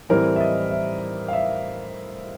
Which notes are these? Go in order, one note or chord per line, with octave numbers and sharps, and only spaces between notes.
A2 E3 G3 C4 E4 A#4
E5
D#5
E5
F5
E5